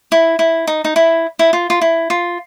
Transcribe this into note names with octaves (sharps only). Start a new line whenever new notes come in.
E4
E4
D#4
D#4
E4
E4
F4
F4
E4
F4